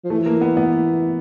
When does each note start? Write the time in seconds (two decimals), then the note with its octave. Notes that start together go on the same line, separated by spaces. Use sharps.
0.04 F3
0.10 E3 A3
0.26 A#3
0.41 B3
0.57 B3